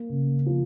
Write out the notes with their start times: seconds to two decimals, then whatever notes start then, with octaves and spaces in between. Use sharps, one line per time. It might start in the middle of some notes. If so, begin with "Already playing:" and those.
Already playing: A#3
0.09 C#3
0.46 F3